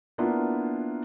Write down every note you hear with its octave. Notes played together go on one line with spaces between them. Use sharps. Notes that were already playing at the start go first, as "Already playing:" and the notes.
A#3 B3 D4 E4 F4